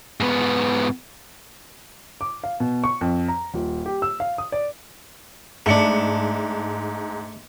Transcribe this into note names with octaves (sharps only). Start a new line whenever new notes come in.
G#2 B3
D6
F5
B2
C#6
F2
A#5
D#1
G4
E6
F5
D#6
D5
G#2 A3 D4 C#7